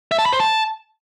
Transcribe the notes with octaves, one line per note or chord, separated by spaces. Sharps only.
E5
A5
B5
C5
A5